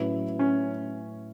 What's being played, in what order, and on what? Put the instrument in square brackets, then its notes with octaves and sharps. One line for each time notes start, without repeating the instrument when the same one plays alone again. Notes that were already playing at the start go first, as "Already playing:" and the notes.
Already playing: [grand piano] A2 F#3 C#4 E4 B4
[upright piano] C#4